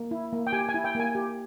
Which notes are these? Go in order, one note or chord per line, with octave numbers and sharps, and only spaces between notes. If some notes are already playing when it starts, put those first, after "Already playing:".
Already playing: A#3
E4
A#3
G5
G4 G#5
G#5
E4
G5
A#3 G#5
G4